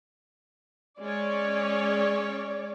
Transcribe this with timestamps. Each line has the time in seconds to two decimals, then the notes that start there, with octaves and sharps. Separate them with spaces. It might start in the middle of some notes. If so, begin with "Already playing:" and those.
1.00 G#3 C#4 C#5 D5